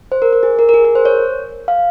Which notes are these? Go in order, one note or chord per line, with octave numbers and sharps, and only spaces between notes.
C5
A#4
A#4
G#4
A#4
A#4
G#4
A#4
C5
C#5
F5